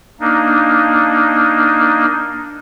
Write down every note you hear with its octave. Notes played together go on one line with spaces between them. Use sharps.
A#3 D4 D#4